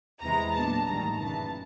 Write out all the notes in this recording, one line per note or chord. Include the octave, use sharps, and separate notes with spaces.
E2 C3 E3 G#3 A#5
A#2 F#3 B3 D4 A5
A1 G2 D#3 A#5
F#2 C#3 E3 A5